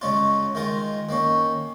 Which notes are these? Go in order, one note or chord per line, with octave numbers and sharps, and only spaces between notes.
C#3 G#3 C#4 F4
D#3 G#3 F4 A#4
D#3 A#3 C#4